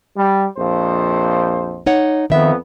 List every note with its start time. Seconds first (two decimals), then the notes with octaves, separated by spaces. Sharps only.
0.17 G3
0.57 A#1 F2 C5
1.86 D#4 C#5 F#5
2.30 F2 D#3 B3 E5